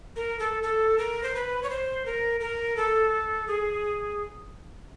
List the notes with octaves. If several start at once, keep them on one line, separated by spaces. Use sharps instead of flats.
A#4
A4
A4
A#4
C5
B4
C#5
C5
A#4
A#4
A4
G#4